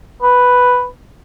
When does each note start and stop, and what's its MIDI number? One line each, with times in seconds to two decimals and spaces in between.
0.22 0.86 71